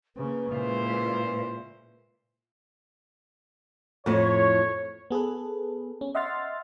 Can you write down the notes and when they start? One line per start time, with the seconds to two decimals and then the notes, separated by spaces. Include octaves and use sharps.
0.16 C#3 A#3 B4
0.52 A#2 C#3 G#3 E4 F4 C5
4.06 F2 A2 C#5
5.11 B3 G#4 A4 B4
6.01 C#4
6.15 D#5 E5 F#5 C6 F6 A6